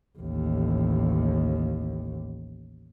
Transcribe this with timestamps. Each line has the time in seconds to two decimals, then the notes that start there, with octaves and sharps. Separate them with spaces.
0.18 A1 D#2